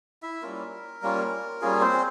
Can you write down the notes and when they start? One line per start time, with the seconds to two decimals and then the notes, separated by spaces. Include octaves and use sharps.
0.23 E4 E5
0.42 G3 A#3 C#4 F4 A#4
1.02 G3 A#3 C#4 F4
1.62 G3 A#3 C#4 F4 G#4
1.82 C4 C5